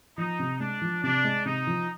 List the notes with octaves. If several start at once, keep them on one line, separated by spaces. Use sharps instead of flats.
F3 D#4
C3
G#3 D4
F3
C3 D4
G#3
C3 D#4
F3